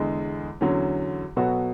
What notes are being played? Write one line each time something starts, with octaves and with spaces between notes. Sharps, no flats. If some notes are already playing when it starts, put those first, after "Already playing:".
Already playing: E2 D3 G#3
E2 D3 F#3 C#4
B2 F#3 B3 F#4 A4